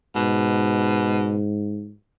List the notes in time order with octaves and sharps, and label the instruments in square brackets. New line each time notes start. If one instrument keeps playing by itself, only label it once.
[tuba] G#2 [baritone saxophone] B2